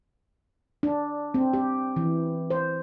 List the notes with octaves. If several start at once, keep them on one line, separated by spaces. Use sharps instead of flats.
D4
C4
G4
E3
C5